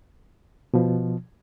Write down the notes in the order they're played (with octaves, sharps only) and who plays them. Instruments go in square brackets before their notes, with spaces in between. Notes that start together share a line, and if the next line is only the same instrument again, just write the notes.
[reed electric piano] B2 F3